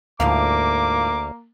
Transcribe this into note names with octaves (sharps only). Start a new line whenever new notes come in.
D2 G#2 F3 A#3 F5 D6